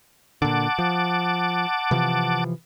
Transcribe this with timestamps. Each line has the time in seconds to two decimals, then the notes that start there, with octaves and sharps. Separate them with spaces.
0.42 A#2 D3 F#5 A5 D6
0.79 F3
1.91 C3 E3 F3